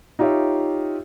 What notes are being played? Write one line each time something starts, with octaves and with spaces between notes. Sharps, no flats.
D#4 F4 G4 C#5 E5